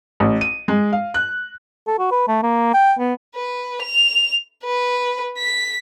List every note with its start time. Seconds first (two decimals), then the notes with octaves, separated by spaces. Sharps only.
0.20 A1
0.41 D#7
0.68 G#3
0.93 F5
1.14 F#6
1.87 A4
1.98 F#4
2.11 B4
2.28 A3
2.43 A#3
2.74 G5
2.99 B3
3.35 B4
3.82 F7
4.65 B4
5.38 B6